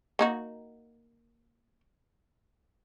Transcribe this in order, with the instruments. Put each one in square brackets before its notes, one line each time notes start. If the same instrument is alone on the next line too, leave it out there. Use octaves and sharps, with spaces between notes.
[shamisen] A#3 D#4 F#4